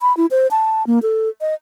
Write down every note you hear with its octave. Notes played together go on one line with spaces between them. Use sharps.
B5
E4
C5
A5
A#3
A4
D#5